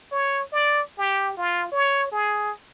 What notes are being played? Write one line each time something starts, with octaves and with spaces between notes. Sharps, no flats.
C#5
D5
G4
F4
C#5
G#4